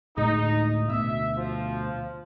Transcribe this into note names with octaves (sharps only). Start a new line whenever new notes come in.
D2 A2 G#3 D#4
D2 B2 E5
F3